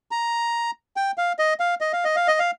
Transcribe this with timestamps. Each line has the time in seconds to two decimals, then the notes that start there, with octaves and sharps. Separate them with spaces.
0.11 A#5
0.96 G5
1.18 F5
1.39 D#5
1.60 F5
1.81 D#5
1.93 F5
2.04 D#5
2.16 F5
2.28 D#5
2.39 F5